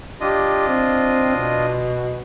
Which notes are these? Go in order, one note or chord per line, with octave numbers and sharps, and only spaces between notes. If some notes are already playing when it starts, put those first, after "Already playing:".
D4 F4 G4 D#5
C4
B2